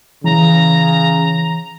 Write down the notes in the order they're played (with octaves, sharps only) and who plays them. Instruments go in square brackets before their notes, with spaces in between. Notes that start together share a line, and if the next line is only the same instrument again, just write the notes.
[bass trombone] C#3 [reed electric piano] E3 [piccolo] A#5